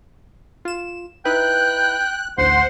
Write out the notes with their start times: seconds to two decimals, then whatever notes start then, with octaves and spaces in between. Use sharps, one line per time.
0.65 F4 E7
1.25 D#4 E4 B4 G5 F#6
2.38 A1 D2 C5 F#5 C6